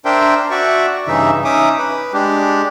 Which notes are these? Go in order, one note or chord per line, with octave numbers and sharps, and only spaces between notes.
D4 A#4 C5 E5 G5
F#4 D5 E5 C#6
G2 C#3 E3 D#4 E5
C#4 D#4 E5 D6 D#6
B4
G#3 D4 G4